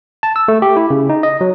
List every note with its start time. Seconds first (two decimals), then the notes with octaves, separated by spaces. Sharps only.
0.23 A5
0.36 E6
0.48 A3
0.62 G4
0.77 E4
0.90 C#3
1.09 D#4
1.23 D#5
1.41 F#3